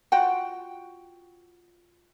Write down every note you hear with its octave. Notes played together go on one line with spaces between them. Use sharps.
F4 F#4 F#5 G5